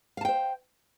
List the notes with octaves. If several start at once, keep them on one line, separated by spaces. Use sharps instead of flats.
C5 F5 G5 A5